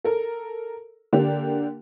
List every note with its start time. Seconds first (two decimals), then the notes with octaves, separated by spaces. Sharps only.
0.04 A4 A#4
1.13 D3 A#3 D4 G4